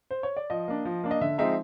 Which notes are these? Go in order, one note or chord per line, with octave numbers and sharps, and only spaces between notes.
C5
C#5
D5
F3 D#5
A#3 D4
F3
A#3 D4
D#5
D3 E5
F3 G#3 C4 D#4 E5